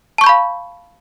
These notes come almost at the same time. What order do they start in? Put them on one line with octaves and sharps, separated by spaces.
A5 C#6 G6 B5 F5